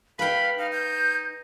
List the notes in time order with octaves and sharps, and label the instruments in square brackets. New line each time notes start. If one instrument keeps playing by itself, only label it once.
[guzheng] B4 G5 [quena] F5 [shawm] B5
[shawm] D#4 [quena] F5
[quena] G6